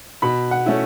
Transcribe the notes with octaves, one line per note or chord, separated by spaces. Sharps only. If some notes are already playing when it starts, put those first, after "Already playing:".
B2 B5
F#5
A3 C#4 E4